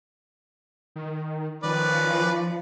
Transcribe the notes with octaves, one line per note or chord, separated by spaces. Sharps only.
D#3
D#3 F3 C#4 B4 D5